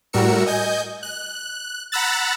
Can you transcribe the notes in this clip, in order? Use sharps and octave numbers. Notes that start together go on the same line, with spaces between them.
A2 G3 F#4 A#4 E6 C#7
D#5 G#5 G6
F#6
F#5 A#5 B5 E6 F#6 A6